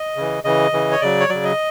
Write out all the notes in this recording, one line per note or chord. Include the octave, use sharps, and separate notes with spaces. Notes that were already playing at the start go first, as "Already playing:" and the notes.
Already playing: D#5
C#3 E3
C#3 E3 D#5
C#3 E3
C#5
C#3 F#3 D5
C#5
C#3 F#3 D5
D#5